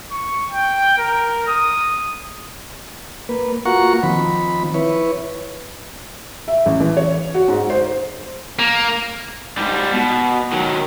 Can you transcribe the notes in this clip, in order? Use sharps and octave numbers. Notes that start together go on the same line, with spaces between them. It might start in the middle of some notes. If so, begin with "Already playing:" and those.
C#6
G5
A#4
D#6
A#3 B4
A#3 F4 F#4 F#5 A#5 C#6
D#3 F3 C4 B5
E4 B4 C#5
E5
A1
E3
C#5
F#4
G#2
C5
A#3
G#2 G3
B2
D#3 F#3